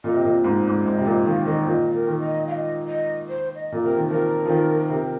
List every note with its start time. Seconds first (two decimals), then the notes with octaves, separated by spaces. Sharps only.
0.04 A#2 D#5
0.14 C3
0.25 A#2
0.44 G#2
0.67 G#2
0.85 G#2 D#5
0.98 C3
1.05 A#2 D#5
1.25 D#3 F5
1.46 D#3 D#5
1.66 A#2 D#5
1.93 A#4
2.07 D#3
2.20 D#5
2.48 F5
2.52 D#5
2.88 D#5
3.29 C5
3.55 D#5
3.72 A#2
3.82 C3 A#4
3.97 D#3
4.09 F3 A#4
4.45 F3
4.50 D#3
4.90 C3